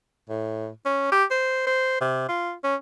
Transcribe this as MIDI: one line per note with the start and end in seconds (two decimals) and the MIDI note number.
0.30 0.69 45
0.85 1.08 61
1.12 1.24 67
1.31 1.64 72
1.67 1.97 72
2.01 2.26 48
2.29 2.53 65
2.64 2.75 61